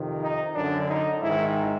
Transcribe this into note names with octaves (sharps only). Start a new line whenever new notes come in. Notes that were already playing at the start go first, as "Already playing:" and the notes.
Already playing: F2 C3 D#3
D#4
F#2 D3 D4
D#4
G#2 D#3 E4